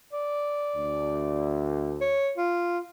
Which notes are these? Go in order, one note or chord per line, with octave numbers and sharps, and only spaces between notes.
D5
D2
C#5
F4